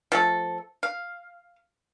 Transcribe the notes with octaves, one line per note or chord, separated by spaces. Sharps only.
F3 A3 A4
F5